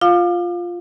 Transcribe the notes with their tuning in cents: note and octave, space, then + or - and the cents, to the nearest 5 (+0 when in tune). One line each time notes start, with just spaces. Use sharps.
F4 +0 F5 +15 D6 +35